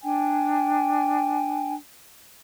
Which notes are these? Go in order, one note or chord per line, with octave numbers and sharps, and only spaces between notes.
D4 G5 G#5